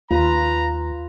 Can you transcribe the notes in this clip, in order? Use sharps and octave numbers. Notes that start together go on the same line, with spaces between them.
D#2 F4 B4 A#5